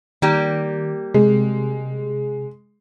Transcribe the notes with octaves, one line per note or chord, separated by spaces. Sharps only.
D#3 G3 A#3 G4
C3 G#3